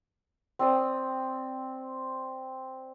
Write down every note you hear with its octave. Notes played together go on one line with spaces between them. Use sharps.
C4 D5 D#6